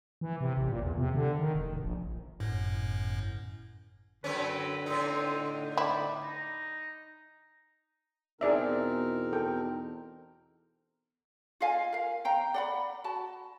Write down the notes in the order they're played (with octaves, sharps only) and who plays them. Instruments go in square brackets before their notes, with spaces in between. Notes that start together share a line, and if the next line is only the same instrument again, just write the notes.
[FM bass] E3
C3
A1
A#2
E2
C3
D3
D#3
F1
D1
A#1
[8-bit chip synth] G1 F#2 A2
[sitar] F#2 C4 C#4 [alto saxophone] D3 [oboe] B4
[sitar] A2 D#4 [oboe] C4
[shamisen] E4 [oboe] D5
[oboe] D#4
[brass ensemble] E2 B2 [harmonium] C4 D#4 A#4 [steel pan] G#4 D5 E5
[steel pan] A4 G5
[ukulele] F4 D#5 F5 G#5
A#4 F5
F5 G5 A#5
D5 F#5 B5
F#4 A5